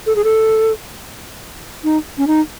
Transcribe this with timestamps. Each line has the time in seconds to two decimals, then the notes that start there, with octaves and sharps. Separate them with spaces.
0.07 A4
0.16 G#4
0.24 A4
1.84 D#4
2.18 C#4
2.27 D#4